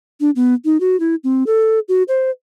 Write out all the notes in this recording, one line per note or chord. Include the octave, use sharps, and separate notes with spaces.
D4
B3
D#4
F#4
E4
C4
A4
F#4
C5